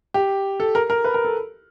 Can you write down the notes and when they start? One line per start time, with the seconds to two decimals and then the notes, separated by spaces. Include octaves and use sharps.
0.14 G4
0.60 A4
0.75 A#4
0.90 A#4
1.04 B4
1.14 A#4
1.25 A4